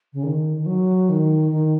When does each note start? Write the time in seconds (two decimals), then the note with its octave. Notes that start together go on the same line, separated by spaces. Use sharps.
0.13 C#3
0.23 D#3
0.57 D#3
0.66 F#3
1.09 D#3
1.52 D#3